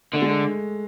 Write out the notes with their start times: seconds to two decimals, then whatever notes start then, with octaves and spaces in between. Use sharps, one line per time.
0.14 D3 A3
0.22 G#3
0.29 A3